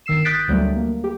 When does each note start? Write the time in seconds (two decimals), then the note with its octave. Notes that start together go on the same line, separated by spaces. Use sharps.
0.06 G1 D#3 E6 C7 E7
0.24 D#6 F#6 G6 A6 B6 D7
0.48 D2 F#3 G3 A3
0.76 A#3
1.04 G4